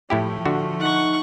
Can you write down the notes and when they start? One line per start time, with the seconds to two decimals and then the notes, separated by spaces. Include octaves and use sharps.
0.10 A2 F3 A3 E4 G4
0.45 D3 F#4
0.80 D#4 F#5 C#6